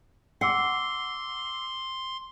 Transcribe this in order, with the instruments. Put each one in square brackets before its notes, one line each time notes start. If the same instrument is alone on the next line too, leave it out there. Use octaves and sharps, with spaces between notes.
[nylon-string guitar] F#5 [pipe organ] C6 [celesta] D6 E6 C7